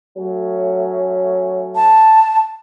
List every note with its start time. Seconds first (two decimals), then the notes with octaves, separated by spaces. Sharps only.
0.17 F#3 A3 C#4
1.75 A5